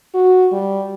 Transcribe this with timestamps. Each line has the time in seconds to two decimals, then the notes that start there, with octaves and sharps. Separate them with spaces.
0.14 F#4
0.52 G3